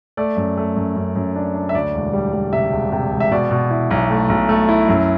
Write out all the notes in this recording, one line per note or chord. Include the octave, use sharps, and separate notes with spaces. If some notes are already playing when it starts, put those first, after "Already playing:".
A3 D5
F#2
A3
F#2
F#2
F#2
D4
D4
E5
D2 D5
E1
G3
G3
C3 E5
E1
C3
E1
E5
B2 D5
B2
E4
B1
A3
B1
A3
E4
F#2